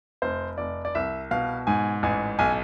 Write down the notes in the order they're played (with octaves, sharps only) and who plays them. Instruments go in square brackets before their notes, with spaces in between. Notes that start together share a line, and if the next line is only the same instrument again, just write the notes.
[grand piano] F1 C5
F1 D5
D5
C2 E5
B2 F5
G#2 G#5
A1 G#5
B1 G#5